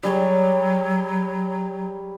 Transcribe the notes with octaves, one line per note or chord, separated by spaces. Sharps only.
F#3 G3 G#4 C#5